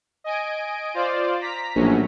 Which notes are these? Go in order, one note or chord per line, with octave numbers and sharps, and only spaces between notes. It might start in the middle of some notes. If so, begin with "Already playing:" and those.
D#5 G#5 D7
F4 C5 D5
A#5 B6
A#1 A2 F#3 C#4